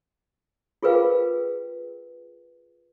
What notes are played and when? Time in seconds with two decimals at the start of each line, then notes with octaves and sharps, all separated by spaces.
0.83 F4 G#4 A#4 B4 F5 G5